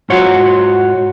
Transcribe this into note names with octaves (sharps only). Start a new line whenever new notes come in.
G#2 F4 F#4 C#5 F#5